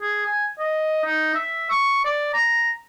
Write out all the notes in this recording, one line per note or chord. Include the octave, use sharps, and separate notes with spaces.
G#4
G#5
D#5
D#4
E5
C#6
D5
A#5